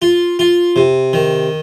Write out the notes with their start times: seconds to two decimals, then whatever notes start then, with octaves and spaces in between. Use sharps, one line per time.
0.02 F4
0.39 F4
0.76 C3
1.13 D#3